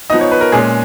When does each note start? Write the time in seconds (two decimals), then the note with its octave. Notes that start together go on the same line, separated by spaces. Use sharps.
0.10 F3 B3 D#4 D#5
0.21 C#5
0.32 B4
0.41 A#4
0.52 A#2 G#3 C#4 G#4